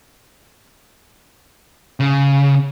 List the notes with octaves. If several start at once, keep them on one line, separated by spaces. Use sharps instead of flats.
C#3